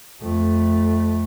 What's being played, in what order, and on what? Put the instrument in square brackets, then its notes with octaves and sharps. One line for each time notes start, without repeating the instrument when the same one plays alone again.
[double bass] F2 A3